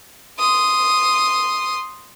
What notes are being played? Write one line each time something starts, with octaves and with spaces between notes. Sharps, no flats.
C6 D#6